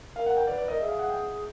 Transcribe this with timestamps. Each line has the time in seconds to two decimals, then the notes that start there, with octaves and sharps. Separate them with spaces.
0.16 A#4 F5
0.26 F#5
0.37 G5
0.47 B4 D5
0.58 B4 D5
0.68 A#4 D#5
0.79 G#4 E5
0.88 F5
0.99 F#5
1.10 G5